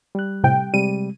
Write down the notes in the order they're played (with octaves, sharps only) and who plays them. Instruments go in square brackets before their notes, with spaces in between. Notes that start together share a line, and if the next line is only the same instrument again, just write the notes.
[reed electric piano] G3 F#6
[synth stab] A2 C3 G5
[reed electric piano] C3 G3 G#3 [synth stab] D#7